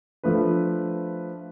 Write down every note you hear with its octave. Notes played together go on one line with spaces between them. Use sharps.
F3 A3 D4 B4